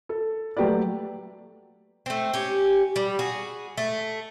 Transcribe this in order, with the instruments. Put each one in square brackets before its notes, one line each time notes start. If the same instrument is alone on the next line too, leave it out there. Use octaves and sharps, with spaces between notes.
[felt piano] A4
F#3 A3 G4 B4 D5
[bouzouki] A3 C4
C#4 G4
G3
F#4 G#4
A3